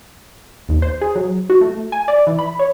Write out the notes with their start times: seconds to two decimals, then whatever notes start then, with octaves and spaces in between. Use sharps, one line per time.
0.69 D#2
0.82 C5
1.01 G#4
1.15 F#3
1.50 F#4
1.61 A3
1.92 G#5
2.08 D5
2.27 E3
2.39 B5
2.59 C#5